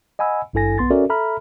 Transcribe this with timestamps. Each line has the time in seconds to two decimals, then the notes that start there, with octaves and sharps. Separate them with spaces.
0.19 D#5 F#5 G#5 B5 E6
0.54 G#1 G2 E4 A4 G#5 A#6
0.78 B1 B3 C6 A6
0.91 C#4 F#4 A4 A#4 D5 E5
1.09 A4 E5 A#5 B5 F6